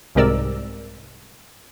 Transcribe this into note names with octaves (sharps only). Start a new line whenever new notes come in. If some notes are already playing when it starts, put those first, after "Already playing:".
C2 G#2 C3 A#4 D5 E6